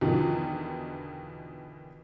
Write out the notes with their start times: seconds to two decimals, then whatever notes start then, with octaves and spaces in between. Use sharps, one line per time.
0.01 E2 B2 D3 D#3 F3